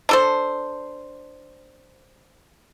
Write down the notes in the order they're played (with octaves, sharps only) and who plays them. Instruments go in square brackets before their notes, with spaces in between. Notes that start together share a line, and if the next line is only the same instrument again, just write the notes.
[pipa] D4 A4 C5